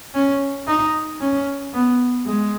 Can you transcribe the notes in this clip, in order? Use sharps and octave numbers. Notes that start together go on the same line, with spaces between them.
C#4
D#4
C#4
B3
G#3